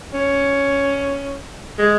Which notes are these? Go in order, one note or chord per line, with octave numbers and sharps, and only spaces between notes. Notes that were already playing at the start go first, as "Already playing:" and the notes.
C#4
G#3